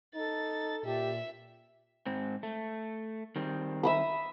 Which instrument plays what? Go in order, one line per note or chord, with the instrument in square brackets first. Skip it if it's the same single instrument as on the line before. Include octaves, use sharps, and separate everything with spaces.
[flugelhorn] D#4 [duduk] A4 [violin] A6
[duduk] A#2 [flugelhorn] G4 [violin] E5
[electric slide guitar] G#2 C4
A3
D#3 G3 C4
[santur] E5 B5 D#6